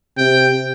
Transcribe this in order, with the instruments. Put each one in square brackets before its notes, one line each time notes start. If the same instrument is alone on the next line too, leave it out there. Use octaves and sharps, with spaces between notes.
[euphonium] C3 [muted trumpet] G5